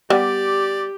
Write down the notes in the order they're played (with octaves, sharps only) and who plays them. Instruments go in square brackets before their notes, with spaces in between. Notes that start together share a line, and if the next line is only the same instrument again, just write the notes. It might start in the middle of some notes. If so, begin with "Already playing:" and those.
[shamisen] G3 B3 [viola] G4 [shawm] D5